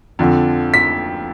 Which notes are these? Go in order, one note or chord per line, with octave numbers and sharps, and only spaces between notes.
F2 D3 F3
B6